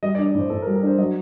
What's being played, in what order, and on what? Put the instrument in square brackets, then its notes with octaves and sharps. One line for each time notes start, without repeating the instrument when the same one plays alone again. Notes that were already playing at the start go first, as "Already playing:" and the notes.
[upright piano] G3 [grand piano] D#5
[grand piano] D5
[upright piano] D4
[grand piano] D5
[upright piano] A2 [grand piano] C5
[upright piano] A2 [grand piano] A4
[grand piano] A#4
[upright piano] G3
[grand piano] A#4
[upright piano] D4 [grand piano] C5
[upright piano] F#3 [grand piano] D#5